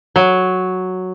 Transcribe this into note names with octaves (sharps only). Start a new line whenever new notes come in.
F#3